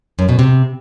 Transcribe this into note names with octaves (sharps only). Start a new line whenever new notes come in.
F#2
B2
C3